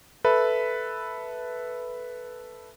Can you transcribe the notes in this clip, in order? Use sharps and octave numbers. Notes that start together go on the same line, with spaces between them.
A4 B4 E5 B5